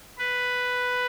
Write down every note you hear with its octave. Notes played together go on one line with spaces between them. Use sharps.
B4